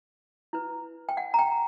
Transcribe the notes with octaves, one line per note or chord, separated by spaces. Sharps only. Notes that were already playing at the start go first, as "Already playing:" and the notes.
E4 B4
G5
F#5
A#5
G5